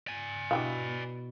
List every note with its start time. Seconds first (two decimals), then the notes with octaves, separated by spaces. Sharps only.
0.07 D5 G#5
0.51 B2 D4 E4 G4 B4 F5